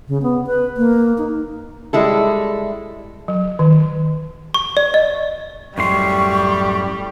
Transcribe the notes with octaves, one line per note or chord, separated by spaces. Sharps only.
C#3
B3
B4
A#3
D#4
G3 G#3 E4 A4
F#3
D#3
C#6
D5
D#5
F#2 A2 G3 C6 C#6